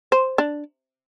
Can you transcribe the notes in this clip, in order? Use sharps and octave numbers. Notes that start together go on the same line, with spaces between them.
C5
D4